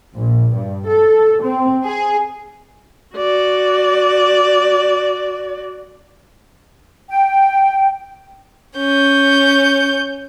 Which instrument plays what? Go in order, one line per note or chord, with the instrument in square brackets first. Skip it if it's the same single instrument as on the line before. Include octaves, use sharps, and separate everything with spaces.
[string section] A#1
G2
A4
C4
G#4
[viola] F#4 D5
[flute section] G5
[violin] C#4 G6